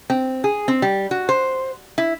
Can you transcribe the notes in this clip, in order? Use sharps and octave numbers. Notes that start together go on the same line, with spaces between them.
C4
G#4
C4
G3
F#4
C5
E4